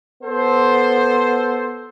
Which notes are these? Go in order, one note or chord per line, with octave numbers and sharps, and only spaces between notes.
B3 A4 C5